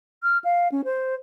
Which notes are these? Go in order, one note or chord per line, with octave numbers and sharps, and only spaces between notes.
F6
F5
C#4
C5